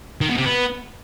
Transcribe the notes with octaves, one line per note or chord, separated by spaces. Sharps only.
D#3
B2
C3
B3